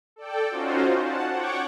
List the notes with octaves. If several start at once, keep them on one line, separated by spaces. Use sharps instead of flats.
A4 D5 G5
C#4 D#4 F4 F#4 C5
F#5 A5
C#5 F#5 G5 C#6 D6